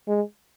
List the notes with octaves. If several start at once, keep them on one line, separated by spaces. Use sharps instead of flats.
G#3